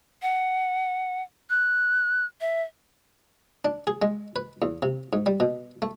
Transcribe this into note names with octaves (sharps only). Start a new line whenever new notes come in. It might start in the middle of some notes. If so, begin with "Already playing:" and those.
F#5
F#6
E5
D4
G#4
G#3
B4
E2
C3
G#2
G3
B2
A3